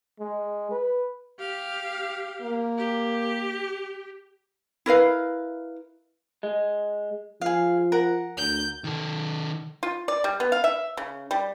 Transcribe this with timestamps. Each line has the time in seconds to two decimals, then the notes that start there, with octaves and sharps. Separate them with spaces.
0.20 G#3
0.71 B4
1.39 G4 F5
2.42 A#3
2.78 G4
4.86 E4 A#4 B4 F5
6.43 G#3
7.41 F3 G#4 F5
7.92 A#4 F#5 A#5
8.37 D2 G6
8.84 D#3 A4
9.83 F4
10.08 D5
10.24 G3
10.40 B3
10.52 F5
10.64 E5
10.97 C#3
11.31 G3